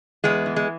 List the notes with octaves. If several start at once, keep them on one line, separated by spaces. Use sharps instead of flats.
E2 G#3 B3
E3
G#3